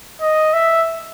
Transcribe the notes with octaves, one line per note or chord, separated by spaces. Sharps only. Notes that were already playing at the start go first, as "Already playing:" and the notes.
D#5
E5